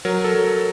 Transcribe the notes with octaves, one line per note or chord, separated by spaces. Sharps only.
F#3 A#4
A4
F#3
A#4